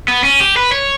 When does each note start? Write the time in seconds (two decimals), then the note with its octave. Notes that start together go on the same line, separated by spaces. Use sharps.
0.08 B3
0.24 C#4
0.40 G4
0.57 B4
0.72 C#5